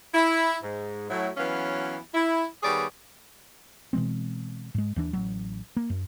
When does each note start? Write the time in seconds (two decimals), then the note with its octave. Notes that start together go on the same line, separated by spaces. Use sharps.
0.14 E4
0.63 G#2
1.10 A2 F#3 E4
1.37 E3 F#3 B3 C#4 F5
2.14 E4
2.63 D#3 G3 B3 G#4 C#5 D5
3.93 B2 E3 G#3 C4
4.74 G#2 G#3
4.96 D#2 E3 D4
5.13 A1 F#3
5.77 A#3
5.90 F#2